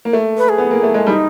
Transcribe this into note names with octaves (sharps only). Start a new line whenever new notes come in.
A#3
A3
B4
G#4
B3
A#3
A3
G#3
G3 D#4